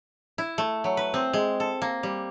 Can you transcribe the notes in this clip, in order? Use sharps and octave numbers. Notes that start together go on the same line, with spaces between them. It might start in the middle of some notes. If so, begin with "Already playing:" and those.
E4
A3
F#3
B4
C4
G#3
A4
A#3
G3